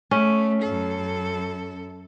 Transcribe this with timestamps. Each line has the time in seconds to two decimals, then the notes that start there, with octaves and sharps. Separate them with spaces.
0.11 A3 C#4
0.62 F#2 A4